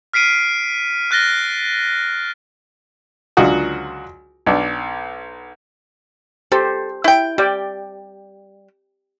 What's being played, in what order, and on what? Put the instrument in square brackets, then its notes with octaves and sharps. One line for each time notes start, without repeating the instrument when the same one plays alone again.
[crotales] F6 B6 C7 D7 D#7
F6 F#6 A6 A#6 G7
[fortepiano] C#2 D3 F#3 F4 F#4 D#6
B1 D4
[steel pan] G4 C5 [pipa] A4
[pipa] E4 G5
[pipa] G3 [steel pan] G4 D5 G5